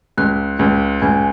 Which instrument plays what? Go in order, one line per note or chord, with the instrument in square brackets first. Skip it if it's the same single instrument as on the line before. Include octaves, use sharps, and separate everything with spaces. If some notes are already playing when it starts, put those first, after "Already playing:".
[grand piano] C#2 [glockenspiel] F#6
[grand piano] C#2
[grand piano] C#2 [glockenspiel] G#5 G#6